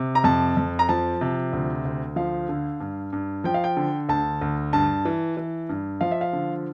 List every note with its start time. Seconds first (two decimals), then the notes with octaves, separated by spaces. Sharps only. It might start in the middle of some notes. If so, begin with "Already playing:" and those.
Already playing: C3
0.15 A#5
0.24 F2 A5
0.57 F2
0.79 A#5
0.89 F3 A5
1.21 C3
1.53 D2
1.85 D2
2.16 F3 F5
2.49 D3
2.80 G2
3.13 G2
3.44 F3 G5
3.54 F5
3.64 G5
3.77 D3
4.09 D2 A5
4.41 D2
4.73 G2 A5
5.05 E3
5.37 E3
5.69 G2
6.01 F3 F5
6.11 E5
6.21 F5
6.33 D3